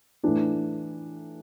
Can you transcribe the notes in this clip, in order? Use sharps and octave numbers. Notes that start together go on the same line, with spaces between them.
A2 E3 D4